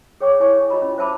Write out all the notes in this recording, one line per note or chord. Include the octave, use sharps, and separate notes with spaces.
G#4 C#5 G5 C#6 D6
E4 C#5 G#5 C#6
F4 G4 D#5 A#5 B5
C#4
C5 E5 A5 B5 D6